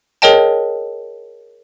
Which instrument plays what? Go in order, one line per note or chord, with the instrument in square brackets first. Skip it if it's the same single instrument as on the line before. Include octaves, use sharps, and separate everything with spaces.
[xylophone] G#4 A#4 C#5 D#5 G5 A5